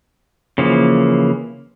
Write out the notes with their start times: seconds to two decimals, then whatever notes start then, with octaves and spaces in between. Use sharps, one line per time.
0.58 C#3 E3 F3 A#3